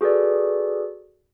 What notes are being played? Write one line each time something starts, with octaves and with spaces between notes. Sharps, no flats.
F#4 G#4 A4 B4 D5